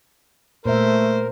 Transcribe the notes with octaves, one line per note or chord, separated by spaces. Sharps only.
A#2 A3 A#4 C5 E5